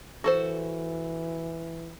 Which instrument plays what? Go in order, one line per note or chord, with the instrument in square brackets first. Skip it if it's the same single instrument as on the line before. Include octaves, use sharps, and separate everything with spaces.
[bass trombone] E3 [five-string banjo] F#4 A4 C5